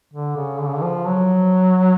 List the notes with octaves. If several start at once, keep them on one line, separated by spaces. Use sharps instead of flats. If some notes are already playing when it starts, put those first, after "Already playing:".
D3
C#3
D3
C#3
D3
F3
F#3